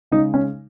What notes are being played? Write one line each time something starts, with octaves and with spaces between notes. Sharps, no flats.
C#3 G#3 D#4
C#4